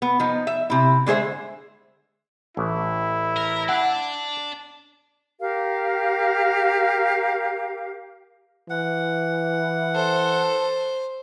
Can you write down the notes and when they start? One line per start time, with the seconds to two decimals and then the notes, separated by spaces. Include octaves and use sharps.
0.02 B3
0.20 F3 D#4
0.47 E5
0.70 C3 E4
1.07 D3 G#3 G#4 C5 E5
2.57 A1 E4
3.37 A#4
3.69 D4 F#5
5.40 G4 A#4 F5
8.70 E3 F#5
9.95 A4 C5